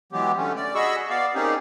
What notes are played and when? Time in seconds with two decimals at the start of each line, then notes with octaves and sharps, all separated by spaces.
0.12 E3 F#3 G#3 B3 G4
0.37 D3 A3 C#4
0.56 D5
0.75 F#4 G#4 D#5 B5 C#6 E6
1.10 B3 D5 F5
1.35 A#3 C4 C#4 D#4 G4 G#4